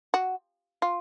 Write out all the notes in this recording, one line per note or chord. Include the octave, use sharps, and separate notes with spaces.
F#4
F4